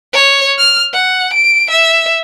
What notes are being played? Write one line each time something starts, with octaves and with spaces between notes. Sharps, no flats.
C#5
F6
F#5
D7
E5